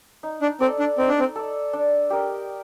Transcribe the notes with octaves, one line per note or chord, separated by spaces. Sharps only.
D#4
D4
C4 A4 D5
D4
C4 D#4
D4
C4
A4 D5
D4
G4 A#4 D#5